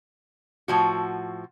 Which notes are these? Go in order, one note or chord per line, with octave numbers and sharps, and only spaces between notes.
A2 F3 F#4